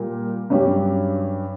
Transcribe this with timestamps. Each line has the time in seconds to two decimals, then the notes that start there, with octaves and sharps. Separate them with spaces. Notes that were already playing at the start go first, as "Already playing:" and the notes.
Already playing: A#2 G3 A#4
0.50 G2 F#3 C#4 G4 C#5